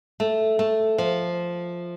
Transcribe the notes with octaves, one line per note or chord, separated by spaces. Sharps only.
A3
A3
F3